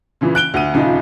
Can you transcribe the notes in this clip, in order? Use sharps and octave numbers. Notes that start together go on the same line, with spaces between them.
A#2 C#3 E3
F#6 D7 G7
D2 D#7
D#1 C#3 D#4 F4